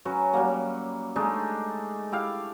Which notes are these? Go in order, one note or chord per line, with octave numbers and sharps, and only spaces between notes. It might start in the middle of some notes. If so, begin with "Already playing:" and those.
F#3 C#4 F#4 B4
F#3 G3 A#3
G#3 A3 D4 D#4
E4 G4 F5